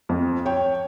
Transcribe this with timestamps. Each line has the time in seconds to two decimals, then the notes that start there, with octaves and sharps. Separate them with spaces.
0.09 F2
0.46 C#5 G5